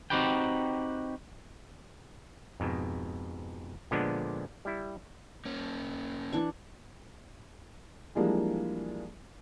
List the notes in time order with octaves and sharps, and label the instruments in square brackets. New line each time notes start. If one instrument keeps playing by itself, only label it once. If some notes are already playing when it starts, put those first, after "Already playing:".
[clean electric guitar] C4 D#4 F#4 G4 B4 G5
[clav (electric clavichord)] F2 G#2 B2
A#2 D3 F3 G#3 B3 D4
G3 E4
[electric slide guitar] A#3 C#4
[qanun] E3 D4 C#6
[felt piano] E3 F3 G3 G#3 A#3 D4